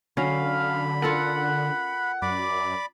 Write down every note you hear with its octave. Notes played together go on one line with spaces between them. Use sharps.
D3 F#3 C#4 F5 B5
F4 A4 A#4 F#5
F#2 D5 B5 D6